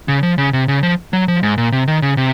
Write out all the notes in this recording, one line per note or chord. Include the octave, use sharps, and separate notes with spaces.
C#3
F3
C#3
C3
C#3
F3
F#3
F3
G#2
A#2
C3
D#3
C#3
C3